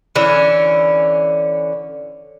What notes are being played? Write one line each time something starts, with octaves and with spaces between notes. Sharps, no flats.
D3 E3 C#4 E5